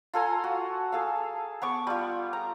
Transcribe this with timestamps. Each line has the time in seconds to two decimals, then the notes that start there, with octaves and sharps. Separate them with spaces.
0.14 F4 A4 G#5 A#5
0.44 F#4
0.92 G#4 A4 F5
1.62 B3 C#6 D6
1.87 G3 F4
2.33 A#5